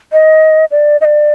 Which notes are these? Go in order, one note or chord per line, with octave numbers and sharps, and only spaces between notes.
D#5
D5
D#5
D5